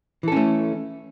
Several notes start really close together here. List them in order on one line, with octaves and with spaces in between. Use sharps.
E3 A4 C#4 A3